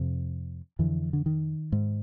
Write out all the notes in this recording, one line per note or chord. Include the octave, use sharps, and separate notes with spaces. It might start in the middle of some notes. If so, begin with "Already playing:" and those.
Already playing: F2 C3
F2 D3 E3
D3
D#3
G#2